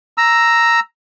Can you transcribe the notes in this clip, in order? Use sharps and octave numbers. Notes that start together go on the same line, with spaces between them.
A#5 E6